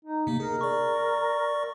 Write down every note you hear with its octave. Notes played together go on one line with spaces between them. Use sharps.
D#4
C3 A#3
G#4 A#4
D5 C#6